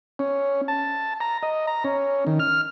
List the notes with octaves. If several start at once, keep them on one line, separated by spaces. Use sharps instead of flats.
C#4
A5
A#5
D#5
A#5
C#4
D#3
F6